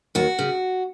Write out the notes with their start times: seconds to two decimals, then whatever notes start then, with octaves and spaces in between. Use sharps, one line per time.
0.15 D#2 F#4
0.39 C#3